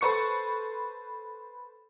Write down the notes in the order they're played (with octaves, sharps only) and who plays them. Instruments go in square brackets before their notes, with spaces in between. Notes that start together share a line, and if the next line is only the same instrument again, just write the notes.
[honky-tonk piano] A4 B4 C5 C#6 C#7